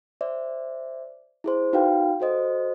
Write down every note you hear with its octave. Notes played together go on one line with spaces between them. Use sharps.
C5 D5 E5
E4 G#4 C5
D#4 F#4 B4 F5 G5
F#4 A4 C5 D#5